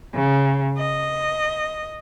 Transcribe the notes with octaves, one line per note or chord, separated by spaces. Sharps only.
C#3
D#5